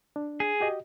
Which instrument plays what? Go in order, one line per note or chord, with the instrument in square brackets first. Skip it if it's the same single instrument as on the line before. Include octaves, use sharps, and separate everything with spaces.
[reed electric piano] D4
[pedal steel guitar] G#4
[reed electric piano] F#4 G4 D#5